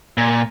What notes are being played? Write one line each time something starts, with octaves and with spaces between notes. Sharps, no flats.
A#2